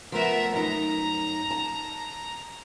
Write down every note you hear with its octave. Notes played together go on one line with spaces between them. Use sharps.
F3 A3 B3 A#4 E5
F#2 D#4 A#5
A5